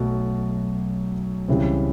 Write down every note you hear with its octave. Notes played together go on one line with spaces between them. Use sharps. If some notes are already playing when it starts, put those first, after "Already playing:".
Already playing: B1 B2 F#3 A3
C#2 C#3 E3 G3 C4